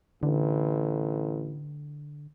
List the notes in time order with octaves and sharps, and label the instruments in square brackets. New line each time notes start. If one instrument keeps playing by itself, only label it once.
[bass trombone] A1 [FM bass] D3